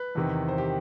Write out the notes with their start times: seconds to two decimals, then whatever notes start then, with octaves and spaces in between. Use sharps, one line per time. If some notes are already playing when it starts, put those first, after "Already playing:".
Already playing: B4
0.15 E2 C3 D#3
0.48 C5
0.58 G4